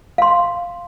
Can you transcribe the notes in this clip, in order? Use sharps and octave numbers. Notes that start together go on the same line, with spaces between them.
F5 C6